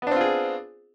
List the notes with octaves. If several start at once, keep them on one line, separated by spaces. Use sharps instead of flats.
B3 C4 D4 F4 G#4